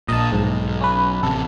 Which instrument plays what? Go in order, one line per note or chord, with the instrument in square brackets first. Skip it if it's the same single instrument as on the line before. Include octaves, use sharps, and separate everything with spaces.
[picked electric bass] A#1 A#2 [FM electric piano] D#5 A5
[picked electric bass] B1 [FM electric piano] G#2
[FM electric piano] C#4 B4
[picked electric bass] A1 C3 [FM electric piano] A4